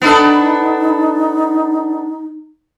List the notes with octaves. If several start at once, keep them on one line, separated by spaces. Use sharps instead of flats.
B3 D4 D#4 A4